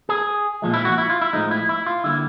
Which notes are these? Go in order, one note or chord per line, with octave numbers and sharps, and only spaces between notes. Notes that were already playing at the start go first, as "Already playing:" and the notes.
G#4
A#2 F3 G#3
E4
F#4
E4
F4
E4
A2 F3 G#3 D#4
E4
E4
F4
D3 G3 A#3 E4